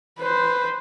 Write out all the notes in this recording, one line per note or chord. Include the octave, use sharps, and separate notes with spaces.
B4 C5